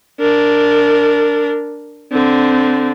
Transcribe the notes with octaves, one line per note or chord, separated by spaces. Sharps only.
D4 A#4
D3 C4